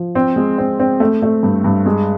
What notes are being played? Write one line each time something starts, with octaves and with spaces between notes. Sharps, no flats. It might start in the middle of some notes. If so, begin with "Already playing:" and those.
Already playing: F3
C4
G#3
C4
C4
A3
A3
G2
G2
G#3